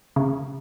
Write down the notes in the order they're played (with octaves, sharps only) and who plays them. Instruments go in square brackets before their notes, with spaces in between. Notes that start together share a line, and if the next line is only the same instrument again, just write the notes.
[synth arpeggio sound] C#3